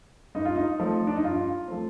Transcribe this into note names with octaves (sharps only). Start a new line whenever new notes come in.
G2 D#4
F4
D#4
F3 A3 C4
D4
D#4
G2 F4
F3 A3 C4